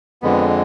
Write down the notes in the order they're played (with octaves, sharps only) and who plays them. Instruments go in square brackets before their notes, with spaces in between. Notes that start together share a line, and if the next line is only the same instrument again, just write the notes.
[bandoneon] F2 D3 G#3 B3